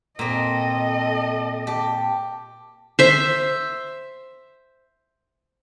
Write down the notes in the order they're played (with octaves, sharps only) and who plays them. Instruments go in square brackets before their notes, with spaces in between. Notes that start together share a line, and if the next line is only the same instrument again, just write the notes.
[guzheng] A#2 C4 [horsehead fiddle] A4 D#5
[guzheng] G4 [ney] A5
[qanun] C5 E5